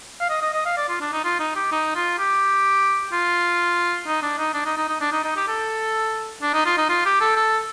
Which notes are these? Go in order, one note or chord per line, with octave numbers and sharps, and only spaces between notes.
F5
D#5
D#5
D#5
F5
D5
F4
D4
D#4
F4
D#4
G4
D#4
F4
G4
F4
D#4
D4
D#4
D4
D#4
D#4
D#4
D4
D#4
D#4
G4
A4
D4
D#4
F4
D#4
F4
G4
A4
A4